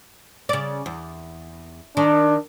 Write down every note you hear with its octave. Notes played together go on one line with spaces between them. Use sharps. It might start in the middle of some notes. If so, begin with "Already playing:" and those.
C#3 D5
E2
D#3 D4